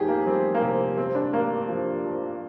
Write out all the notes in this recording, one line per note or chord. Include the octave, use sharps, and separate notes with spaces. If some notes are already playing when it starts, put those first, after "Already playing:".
Already playing: F2 D#3 G4 G#4
A#3
G3 C4
A#3
C3 C4
G2 C4
D4
G2 A#3
F3
F3